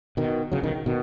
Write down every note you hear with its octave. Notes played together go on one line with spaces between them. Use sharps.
B2 D#3
C#3 F#3
B2 D#3
B2 D#3